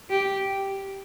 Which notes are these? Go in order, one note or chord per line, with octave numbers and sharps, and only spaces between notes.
G4